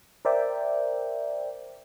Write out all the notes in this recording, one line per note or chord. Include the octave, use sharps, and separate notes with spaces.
A#4 C5 D5 E5 G5